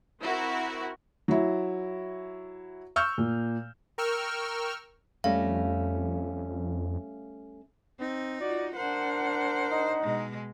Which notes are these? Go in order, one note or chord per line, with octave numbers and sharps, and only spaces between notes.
C4 E4 F#4 A#4
F#3 E4
C#6 E6 F6 G6
A#2
A#4 G5 C#6 E6 F6
F2 G3 A3 C#4 F5
C4 D#4
F4 F#4 D5
D4 A#4 C5 F#5
D#4
B2 G#3